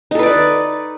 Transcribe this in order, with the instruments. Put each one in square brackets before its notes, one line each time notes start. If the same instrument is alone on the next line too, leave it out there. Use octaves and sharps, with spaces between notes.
[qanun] D#4
A4
B4
D5